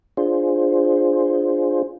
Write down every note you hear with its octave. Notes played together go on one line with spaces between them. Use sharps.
D4 F4 G#4 C5